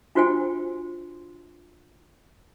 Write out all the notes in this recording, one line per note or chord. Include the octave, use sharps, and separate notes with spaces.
D4 F4 F#4 C5 G5 G#5